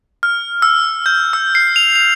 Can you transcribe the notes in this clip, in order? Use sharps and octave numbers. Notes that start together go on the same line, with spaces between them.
F6
E6
G6
E6
C7
F7
F7